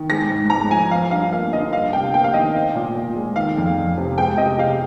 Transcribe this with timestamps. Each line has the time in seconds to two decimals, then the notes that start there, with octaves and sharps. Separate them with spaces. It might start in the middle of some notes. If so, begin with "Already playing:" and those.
Already playing: D#3
0.10 G#3 A#6
0.30 G#2
0.50 G#2 A#5
0.71 F3 G#5
0.91 F3 F5
1.11 G2 F5
1.32 A#3 F5
1.53 D3 D#5
1.72 G3 F5
1.93 C3 G5
2.13 A#3 G5
2.24 F5
2.34 D#3 D#5
2.55 C4
2.75 A#2
2.95 A#2
3.16 G#3
3.36 D#3 F5
3.57 F2
3.77 F2
3.97 C3
4.18 G#3 G5
4.38 C3 D#5
4.58 C3 F5